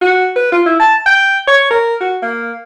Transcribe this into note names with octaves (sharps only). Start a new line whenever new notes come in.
F#4
B4
F4
E4
A5
G5
C#5
A#4
F#4
A#3